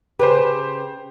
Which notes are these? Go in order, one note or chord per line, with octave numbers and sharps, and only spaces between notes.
C#3 G4 B4 C5